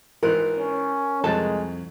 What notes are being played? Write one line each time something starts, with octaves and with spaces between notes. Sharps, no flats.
G#1 E3 A#4 F#6
C#4
C2 F2 F#3 G#3 A4 A5